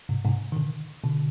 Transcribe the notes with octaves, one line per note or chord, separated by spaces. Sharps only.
G#2 C3
G#2 C3
D#3
B2 D3
B2 D3